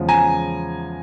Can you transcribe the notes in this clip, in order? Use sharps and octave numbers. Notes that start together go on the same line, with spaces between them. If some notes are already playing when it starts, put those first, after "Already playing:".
Already playing: E2 C#3 F3 G#3
G#5 A#5